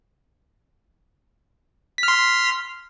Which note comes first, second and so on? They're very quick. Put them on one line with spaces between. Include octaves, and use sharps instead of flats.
B6 F6 C6